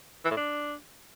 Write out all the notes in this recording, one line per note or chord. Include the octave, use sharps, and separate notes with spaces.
E3
A2
D4